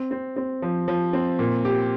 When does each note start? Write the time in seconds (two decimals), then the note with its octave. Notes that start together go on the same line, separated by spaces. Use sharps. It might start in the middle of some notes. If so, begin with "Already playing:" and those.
Already playing: C4
0.11 C4
0.36 C4
0.62 F3
0.88 F3
1.13 C4
1.39 A#2
1.65 G4